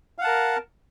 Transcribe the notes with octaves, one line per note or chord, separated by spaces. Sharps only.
A#4 F5 F#5 A5